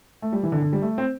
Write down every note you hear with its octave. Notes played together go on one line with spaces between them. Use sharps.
A3
G3
E3
D3
D3
G3
A3
C4